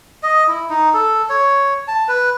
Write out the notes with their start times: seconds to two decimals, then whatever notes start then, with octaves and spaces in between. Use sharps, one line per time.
0.23 D#5
0.48 E4
0.69 D#4
0.94 A4
1.29 C#5
1.88 A5
2.08 B4